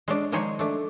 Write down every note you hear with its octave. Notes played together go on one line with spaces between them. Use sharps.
G#3 C#4 D4
D#3 F3 G#3 D#4 G#4 C#5
A3 D4